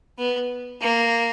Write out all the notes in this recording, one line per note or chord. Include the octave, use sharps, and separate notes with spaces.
B3
A#3